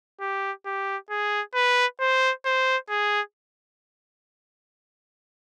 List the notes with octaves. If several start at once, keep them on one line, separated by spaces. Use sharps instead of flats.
G4
G4
G#4
B4
C5
C5
G#4